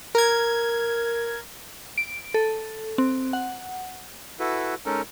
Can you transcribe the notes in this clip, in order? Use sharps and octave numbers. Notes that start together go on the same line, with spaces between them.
A#4 G#6
D7
A4
C4
F#5
E4 F#4 A4 B4
G#3 C#4 D#4 A4 A#4